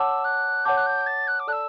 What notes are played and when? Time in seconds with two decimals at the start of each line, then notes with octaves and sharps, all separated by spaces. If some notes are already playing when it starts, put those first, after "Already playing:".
Already playing: C#5 F#5 A5 D6 E6
0.24 F#6
0.65 C#5 F#5 A5 D6 G6
0.77 F#6
0.86 G6
1.06 A6
1.27 F#6
1.39 D6
1.47 A4 D5 A5 E6 F#6